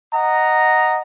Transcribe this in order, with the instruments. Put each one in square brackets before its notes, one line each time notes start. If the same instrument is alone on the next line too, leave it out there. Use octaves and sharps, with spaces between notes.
[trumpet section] D#5 F#5 A#5